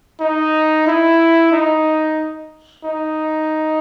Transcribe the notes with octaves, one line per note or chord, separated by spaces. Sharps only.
D#4
E4
D#4
D#4